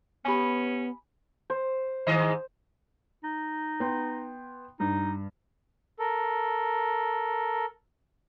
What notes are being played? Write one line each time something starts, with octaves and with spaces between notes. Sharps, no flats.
B3 C#4 G4 G#5 B5 C#6 D#6
C5
G#2 D#3 D#5
D#4
B3 G5 C6
G2 D#4
A4 A#4